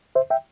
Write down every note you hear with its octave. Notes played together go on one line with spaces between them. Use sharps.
C5 E5
E5 G5